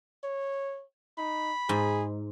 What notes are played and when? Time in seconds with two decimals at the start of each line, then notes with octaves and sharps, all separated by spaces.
0.24 C#5
1.18 D#4 B5
1.69 G#2 G#4